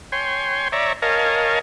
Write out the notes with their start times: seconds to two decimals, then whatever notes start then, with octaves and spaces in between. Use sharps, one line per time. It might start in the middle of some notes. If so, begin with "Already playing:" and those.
0.12 C#5 G5 G#5 C6
0.72 C#5 D5 E5 A#5
1.02 A#4 C#5 D#5 F5 G#5 A5